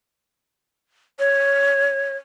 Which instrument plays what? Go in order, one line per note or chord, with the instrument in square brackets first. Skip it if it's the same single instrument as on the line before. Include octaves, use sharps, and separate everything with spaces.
[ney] C#5